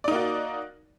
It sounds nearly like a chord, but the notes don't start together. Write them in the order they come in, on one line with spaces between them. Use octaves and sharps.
D5 D#4 A#3 F#4